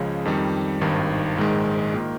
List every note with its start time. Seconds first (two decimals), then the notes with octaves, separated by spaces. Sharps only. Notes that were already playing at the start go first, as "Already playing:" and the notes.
Already playing: C#2 C#3 F3 G#3 C#4
0.25 F2 D#3 G3
0.81 G#1 G2 D#3
1.37 A#1 G#2 D#3 G#3
1.93 D#3 A#3 F4